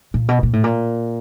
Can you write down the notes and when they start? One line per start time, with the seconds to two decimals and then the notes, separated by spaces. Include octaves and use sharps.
0.14 A#2
0.29 B2
0.43 A#2
0.53 A2
0.64 A#2